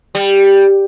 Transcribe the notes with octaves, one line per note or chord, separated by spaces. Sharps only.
G3